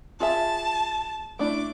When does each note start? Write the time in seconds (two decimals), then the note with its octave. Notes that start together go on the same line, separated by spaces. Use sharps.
0.20 F4 G#4 E5 A5
1.39 A3 D4 E4 D6